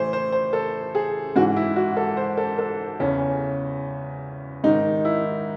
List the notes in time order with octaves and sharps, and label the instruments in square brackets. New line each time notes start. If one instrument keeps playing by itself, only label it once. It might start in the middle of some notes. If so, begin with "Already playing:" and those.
Already playing: [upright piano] A2 E3 C5
C5
C5
A4
G#4
G#2 E3 F#4
E4
F#4
A4
C5
A4
A4
E2 C#3 E3 C#4
G#2 D#3 D#4
E4